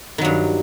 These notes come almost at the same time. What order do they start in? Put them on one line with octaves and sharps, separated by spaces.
D#3 F#3 G2